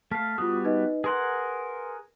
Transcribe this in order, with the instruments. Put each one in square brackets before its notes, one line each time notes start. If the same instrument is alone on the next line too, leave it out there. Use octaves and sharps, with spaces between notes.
[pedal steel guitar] A3 F5 [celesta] A5 F6 B6
[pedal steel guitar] G3 B3 F#4 [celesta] F4 D#6
[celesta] D#4 B4 D#5
[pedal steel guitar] G#4 A#4 F#5 [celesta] B4 C6